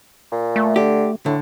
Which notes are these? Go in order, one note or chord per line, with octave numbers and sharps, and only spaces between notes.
A#2
A3
D3 G4
A2 D3